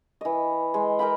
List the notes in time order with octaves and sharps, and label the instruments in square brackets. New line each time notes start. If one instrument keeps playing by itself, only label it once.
[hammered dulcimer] E3 D#5
G#3
A#4 D#5 G5 B5